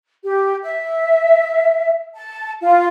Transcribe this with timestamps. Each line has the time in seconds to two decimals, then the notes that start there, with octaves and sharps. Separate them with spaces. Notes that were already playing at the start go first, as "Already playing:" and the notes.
0.24 G4
0.61 E5
2.15 A5
2.62 F4